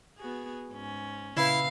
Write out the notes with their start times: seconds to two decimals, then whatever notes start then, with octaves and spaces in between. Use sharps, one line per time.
0.18 B3 F#4 G#4
0.72 G#2 C#4
1.37 A#2 C#3 E4 B4 F5